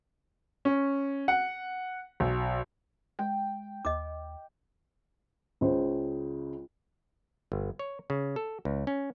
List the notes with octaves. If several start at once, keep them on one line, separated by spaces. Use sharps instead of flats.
C#4
F#5
B1
G#3 G5
D#2 D#5 D6
C#2 C#3 C5
G1
C#5
C#3
A4
C#2
C#4